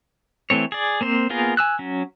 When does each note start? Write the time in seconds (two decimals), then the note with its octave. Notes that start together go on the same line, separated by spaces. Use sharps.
0.50 E3 A3 C4 C#5
0.72 G#4 D5
1.01 A#3 C4 C5
1.30 A#3 B3 F4 G#4 A#4
1.57 G#5 E6 F#6
1.79 F#3 C#4